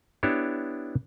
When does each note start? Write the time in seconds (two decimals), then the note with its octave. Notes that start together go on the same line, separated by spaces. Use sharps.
0.23 B3 D4 E4 G4 C#5